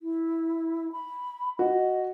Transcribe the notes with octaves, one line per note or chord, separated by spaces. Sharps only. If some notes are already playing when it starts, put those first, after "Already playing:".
E4
B5
F#4 D#5